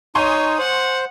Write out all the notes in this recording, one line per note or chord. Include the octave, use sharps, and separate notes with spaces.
D#4 C#5 G#5 C6 C#6 D#6
C5 F#5